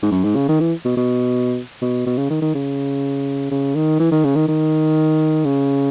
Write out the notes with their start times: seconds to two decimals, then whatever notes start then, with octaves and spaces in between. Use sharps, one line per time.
0.03 G#2
0.12 F#2
0.24 G#2
0.36 C#3
0.49 D#3
0.60 E3
0.85 B2
0.97 B2
1.82 B2
2.06 B2
2.18 C#3
2.30 D#3
2.42 D#3
2.54 C#3
3.51 C#3
3.75 D#3
4.00 E3
4.11 D#3
4.24 C#3
4.36 D#3
4.48 D#3
5.45 C#3